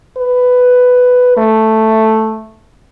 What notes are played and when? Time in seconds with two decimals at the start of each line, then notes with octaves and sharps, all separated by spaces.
0.17 B4
1.37 A3